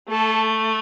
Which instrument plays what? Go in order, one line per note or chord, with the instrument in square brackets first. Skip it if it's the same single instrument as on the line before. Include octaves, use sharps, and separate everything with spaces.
[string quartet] A3 A4